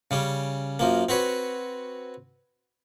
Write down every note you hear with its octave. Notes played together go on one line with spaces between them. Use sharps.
C#3 G3 C#4
F#2 F3 A#3
C4 F#4 B4 C#5